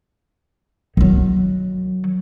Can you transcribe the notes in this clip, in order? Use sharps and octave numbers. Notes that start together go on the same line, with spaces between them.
D#3 F#3